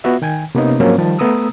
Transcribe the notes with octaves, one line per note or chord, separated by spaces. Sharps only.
B3 F4 F#4 E5
D#3 G5 G#5
C3 A#3 B3 C#4 D#4
G#2 F3 F#3 A#3 C4 C#4
D#3 F3 G3 G4 A5
A3 B3 A#5 D#6 E6